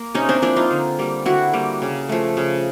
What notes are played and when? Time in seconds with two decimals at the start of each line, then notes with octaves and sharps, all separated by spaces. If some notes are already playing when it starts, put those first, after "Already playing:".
Already playing: A#3
0.14 C3 C#4 D#4
0.29 C4 D4
0.42 F3 A#3 D4 E4
0.56 D#4 F4
0.71 D3
0.99 G3 A#3
1.26 D3 E4 F#4
1.53 G3 A#3
1.82 C#3
2.09 F3 A3
2.37 C#3